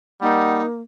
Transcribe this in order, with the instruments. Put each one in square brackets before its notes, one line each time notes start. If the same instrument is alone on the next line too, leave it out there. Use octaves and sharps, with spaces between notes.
[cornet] G3 [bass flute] A#3 [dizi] D#4 [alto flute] F#5